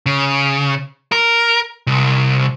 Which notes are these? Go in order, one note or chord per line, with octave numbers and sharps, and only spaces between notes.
C#3
A#4
C2